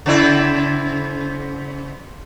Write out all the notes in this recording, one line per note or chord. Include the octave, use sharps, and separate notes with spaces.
C#3 C4 E4